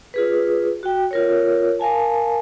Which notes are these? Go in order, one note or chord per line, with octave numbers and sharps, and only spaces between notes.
F4 G#4 B4
F#4 G5
F4 A#4 C#5
A#4 F5 G#5 A5